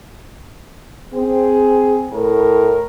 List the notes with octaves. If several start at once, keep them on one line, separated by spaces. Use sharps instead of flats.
C4 G#4
A2 A#4